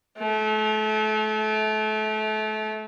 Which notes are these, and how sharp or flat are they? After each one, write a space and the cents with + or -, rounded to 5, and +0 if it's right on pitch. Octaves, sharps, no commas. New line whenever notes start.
A3 -30